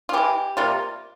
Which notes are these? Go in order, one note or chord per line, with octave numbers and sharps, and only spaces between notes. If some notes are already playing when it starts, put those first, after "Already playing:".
F4
E3 G#3 G4
C3 G3 A#3 F4